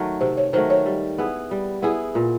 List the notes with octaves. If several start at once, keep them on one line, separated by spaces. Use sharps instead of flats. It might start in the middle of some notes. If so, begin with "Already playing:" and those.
Already playing: D#3 F#3 A3
C3 C5
C#5
D#3 F#3 A3 C5
C#5
G3
B3 E4 G#4
G3
B3 E4 G#4
A#2